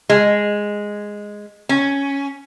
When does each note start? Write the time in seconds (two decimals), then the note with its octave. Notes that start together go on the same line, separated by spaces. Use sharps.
0.09 G#3
1.69 C#4